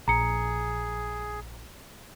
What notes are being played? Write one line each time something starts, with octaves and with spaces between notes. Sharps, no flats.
A#1 G#4 A#5 C#7